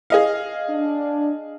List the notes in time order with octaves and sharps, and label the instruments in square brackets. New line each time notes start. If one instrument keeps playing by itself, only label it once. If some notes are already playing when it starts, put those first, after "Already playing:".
[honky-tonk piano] G#4 D#5 F5
[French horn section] D4